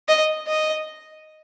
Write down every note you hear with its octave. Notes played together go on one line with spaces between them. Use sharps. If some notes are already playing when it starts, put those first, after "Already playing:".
D#5
D#5